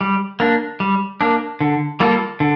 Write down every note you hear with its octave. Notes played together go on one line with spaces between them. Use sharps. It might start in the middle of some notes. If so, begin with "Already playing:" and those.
G3
A#3 D4
G3
A#3 D4
D3
G3 A#3 F4 A4
D3